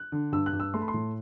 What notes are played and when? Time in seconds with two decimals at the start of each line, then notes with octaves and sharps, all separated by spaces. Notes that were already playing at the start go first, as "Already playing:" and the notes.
Already playing: F#6
0.12 D3
0.32 G2 E6
0.46 F#6
0.53 G2
0.60 E6
0.74 A3 C6
0.81 B5
0.88 C6
0.94 A2